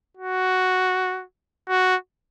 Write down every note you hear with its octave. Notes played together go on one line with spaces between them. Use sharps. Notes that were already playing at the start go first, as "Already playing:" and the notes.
F#4
F#4